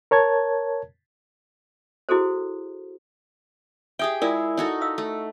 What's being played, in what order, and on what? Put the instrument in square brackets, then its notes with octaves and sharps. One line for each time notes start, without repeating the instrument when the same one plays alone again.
[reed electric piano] A#4 C#5 A5 G#6
[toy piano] E4 F#4 G#4 A4 C5
[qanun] G4 G#4 G5 [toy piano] E5 D#6
[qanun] G#3 E4 [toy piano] F4 A#4 D5
[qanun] D#4 F#4 A4
[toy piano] D#5 F5 E6
[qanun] A3